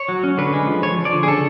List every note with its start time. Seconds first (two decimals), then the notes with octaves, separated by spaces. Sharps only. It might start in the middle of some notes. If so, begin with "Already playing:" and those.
Already playing: C#5
0.09 F#3
0.23 C#4
0.38 D3 B4
0.54 G#3
0.67 F3
0.82 F3 C#5
0.98 F3
1.05 D5
1.12 D3
1.23 G#4
1.27 C#3 A4